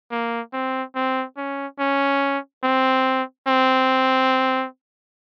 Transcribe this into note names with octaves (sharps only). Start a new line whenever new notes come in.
A#3
C4
C4
C#4
C#4
C4
C4